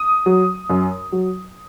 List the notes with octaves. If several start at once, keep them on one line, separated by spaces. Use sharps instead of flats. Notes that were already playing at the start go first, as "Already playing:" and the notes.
Already playing: D#6
F#3
F#2
F#3